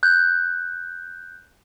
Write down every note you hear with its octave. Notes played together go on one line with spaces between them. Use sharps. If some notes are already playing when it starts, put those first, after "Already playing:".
F#6 G6